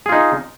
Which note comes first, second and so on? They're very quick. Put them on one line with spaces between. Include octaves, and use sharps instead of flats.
G#4 F4 D#4